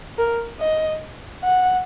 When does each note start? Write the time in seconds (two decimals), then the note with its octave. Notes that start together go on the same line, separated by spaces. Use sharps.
0.18 A#4
0.60 D#5
1.44 F#5